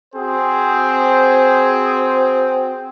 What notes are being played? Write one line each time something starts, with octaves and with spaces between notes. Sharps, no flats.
C4 F#4 G#4 C5